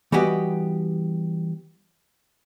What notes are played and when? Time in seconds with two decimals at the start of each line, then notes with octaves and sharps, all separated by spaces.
0.12 E3 G3 B3 F#4 G4 D#5